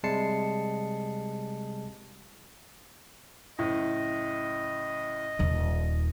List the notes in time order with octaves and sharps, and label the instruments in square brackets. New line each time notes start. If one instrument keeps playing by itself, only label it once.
[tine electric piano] C3 G3 G#3 A5 C7 C#7
[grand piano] F#1 A2 [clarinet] D#5
[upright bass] D#1 D#2